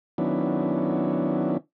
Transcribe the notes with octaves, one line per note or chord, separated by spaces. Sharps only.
D#3 F#3 B3 C#4 D4 E4